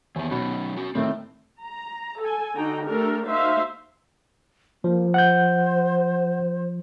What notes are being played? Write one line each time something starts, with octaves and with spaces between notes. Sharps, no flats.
D#2 E3 B3
B2 F#3 C#4 D#4
C#4 F#4
A2 D#3 A3 C4
A#5
A4 G#5
D3 D#4 F#4 G5 A#5
A3 D4 G4 A4 A#4
A#3 D#4 F#4 C5 E5 F5
F3 A#3
C5 F#5 F#6 G6